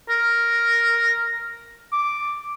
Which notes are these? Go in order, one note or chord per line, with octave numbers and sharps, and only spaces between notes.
A#4
D6